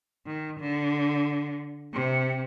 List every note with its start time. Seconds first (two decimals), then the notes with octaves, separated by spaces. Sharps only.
0.26 D#3
0.59 D3
1.93 C3